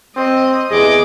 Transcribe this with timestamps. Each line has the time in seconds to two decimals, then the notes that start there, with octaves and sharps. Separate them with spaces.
0.16 C4 D#5
0.71 E2 G#4 D#5 D6